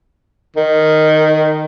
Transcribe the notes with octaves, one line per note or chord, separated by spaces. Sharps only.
D#3